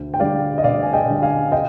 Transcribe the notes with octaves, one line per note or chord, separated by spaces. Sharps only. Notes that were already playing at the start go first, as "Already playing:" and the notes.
Already playing: D2
G5
D3 G3 D5 F5
D#5
D2 D5 F5
G#5
D#5 G5
D3 G3
F5 G#5
D#5 G5